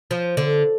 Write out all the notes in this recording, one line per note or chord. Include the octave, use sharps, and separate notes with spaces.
F3
D3